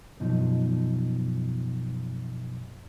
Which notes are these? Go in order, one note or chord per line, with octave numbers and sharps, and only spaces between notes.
F#2 B2 F3 D#4